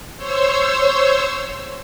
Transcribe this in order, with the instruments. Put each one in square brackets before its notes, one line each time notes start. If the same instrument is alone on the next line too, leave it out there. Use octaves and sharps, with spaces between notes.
[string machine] C5 C#5 E6